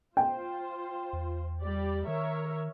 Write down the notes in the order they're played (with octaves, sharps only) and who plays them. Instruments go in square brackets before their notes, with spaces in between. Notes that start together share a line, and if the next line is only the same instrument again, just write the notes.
[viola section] F4 C5 [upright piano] G5
[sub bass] E2
[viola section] G3 G4 D5
[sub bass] D#3 [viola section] A#4 C#5 E5